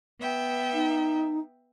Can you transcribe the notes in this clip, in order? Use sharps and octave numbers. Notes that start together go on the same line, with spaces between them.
B3 E5 G5
D#4